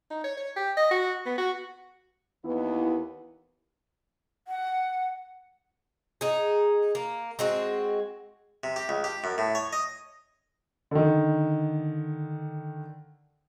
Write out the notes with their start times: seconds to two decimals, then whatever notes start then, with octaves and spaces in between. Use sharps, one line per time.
0.10 D#4
0.24 C#5
0.37 C#5
0.56 G4
0.77 D#5
0.91 F#4
1.26 B3
1.38 F#4
2.44 D#2 E3 B3 E4
4.48 F#5
6.21 D#4 G#4
6.95 A#3
7.39 G#3 C4 F#4
8.64 C3
8.76 G4
8.89 C#2
9.04 G4
9.24 F#2
9.38 A2
9.55 C#5
9.73 D#5
10.91 D3 D#3